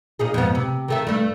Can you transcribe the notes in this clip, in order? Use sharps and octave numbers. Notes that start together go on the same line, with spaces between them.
A#2 D#4 G#4
F2 G#2 B3
C3
D#3 A3 E5
G2 A3